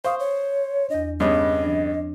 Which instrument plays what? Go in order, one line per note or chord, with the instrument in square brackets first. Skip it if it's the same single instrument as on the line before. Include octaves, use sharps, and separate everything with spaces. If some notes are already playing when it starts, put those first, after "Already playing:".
[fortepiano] C5 [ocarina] F5 [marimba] C#6 D#6
[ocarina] C#5
[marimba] E2 D4 [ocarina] D#5
[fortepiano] G2 C#3 B3 [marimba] C4 C#5 D#6 [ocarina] D#5
[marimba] F3 D4